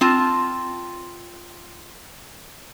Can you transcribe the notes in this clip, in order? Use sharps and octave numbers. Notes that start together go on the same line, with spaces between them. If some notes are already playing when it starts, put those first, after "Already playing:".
C4 F4 A5